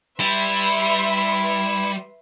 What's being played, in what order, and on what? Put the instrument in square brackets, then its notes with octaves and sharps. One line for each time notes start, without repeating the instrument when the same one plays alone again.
[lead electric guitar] G3 [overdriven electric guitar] E4 [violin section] B4 E5 C6